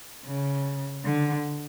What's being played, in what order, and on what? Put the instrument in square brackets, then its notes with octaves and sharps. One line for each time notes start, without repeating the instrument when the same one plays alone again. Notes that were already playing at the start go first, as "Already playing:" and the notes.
[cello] C#3
D3